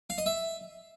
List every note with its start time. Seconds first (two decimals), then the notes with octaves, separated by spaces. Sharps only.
0.10 F5
0.18 D#5
0.26 E5